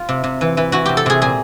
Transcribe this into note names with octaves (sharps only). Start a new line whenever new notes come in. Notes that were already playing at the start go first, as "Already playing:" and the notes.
Already playing: F4
C3
C3
E3
E3
E3 F#4
C3 G4
A4
C3 G#4
A#2 G#4